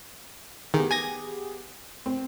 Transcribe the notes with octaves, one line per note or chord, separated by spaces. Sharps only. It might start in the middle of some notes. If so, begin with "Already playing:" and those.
D#3 B3 G4 G#4
G#5 G#6 A#6
C4